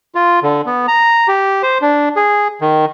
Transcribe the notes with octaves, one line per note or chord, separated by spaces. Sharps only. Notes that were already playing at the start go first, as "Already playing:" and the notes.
F4
D3
B3
A#5
G4
C5
D4
G#4
D#3